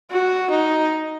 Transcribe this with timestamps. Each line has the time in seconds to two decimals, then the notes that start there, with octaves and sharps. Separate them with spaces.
0.11 F#4
0.50 D#4